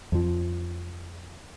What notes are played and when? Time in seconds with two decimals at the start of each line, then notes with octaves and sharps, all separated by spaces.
0.12 F2 F3